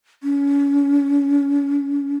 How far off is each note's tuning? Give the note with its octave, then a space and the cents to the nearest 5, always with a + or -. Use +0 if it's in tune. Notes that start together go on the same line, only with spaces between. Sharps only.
C#4 +30